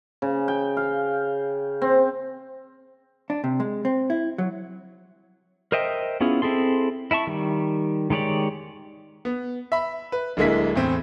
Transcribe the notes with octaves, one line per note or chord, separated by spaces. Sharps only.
C#3
G5
F5
C4
D4
C3
G#3
C4
E4
F#3
A#4 C5 D#5 E5 G5
B3 C#4 E4 F4 G#4
C4 E4 G#4 A4 C6
E4 E5 A5 C#6
D#3 G3
D#3 G#3 G4 C#5 D5
B3
E5 B5
B4
D1 D3 G#3 A#3 E4 B6
E2 A2 C4